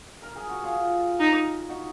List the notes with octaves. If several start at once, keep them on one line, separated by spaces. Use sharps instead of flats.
A#4
G#4
F#4
F4 G#4
D#4
D#4 F#4